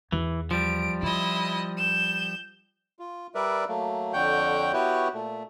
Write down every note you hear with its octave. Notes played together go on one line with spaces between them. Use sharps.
E2 E3
F3 G3 D7
E4 F4 D#5
G6 E7
F4
G3 A#4 B4 D5 E5
F#3 A3 A#3
F2 D3 C#5 F#5 G5 G6
B3 E4 F#4 G4 B4 C#5
A#2 A3